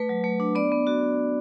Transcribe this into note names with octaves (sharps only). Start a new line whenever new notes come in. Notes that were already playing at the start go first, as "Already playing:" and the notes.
Already playing: A3 B4
F#3
A3
D4
B3 D5
B3
F#4